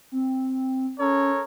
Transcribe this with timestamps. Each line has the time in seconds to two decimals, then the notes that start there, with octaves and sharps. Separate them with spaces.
0.12 C4
0.99 C#4 A4 A#4 C#5